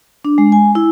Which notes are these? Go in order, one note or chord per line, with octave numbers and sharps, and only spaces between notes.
D4
G#3
G#5
E4